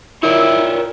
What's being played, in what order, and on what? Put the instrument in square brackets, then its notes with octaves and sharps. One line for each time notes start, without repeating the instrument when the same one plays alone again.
[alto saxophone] E4 [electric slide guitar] F4 C#5 D5 [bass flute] A#4